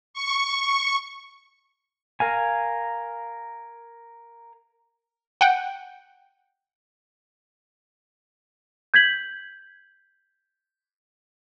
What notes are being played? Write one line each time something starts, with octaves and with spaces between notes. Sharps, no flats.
C#6
A#4 F5 G#5
F#5 G5
G6 G#6 B6 F#7